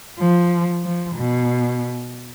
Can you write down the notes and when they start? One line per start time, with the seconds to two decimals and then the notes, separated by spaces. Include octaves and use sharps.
0.20 F3
0.84 F3
1.16 B2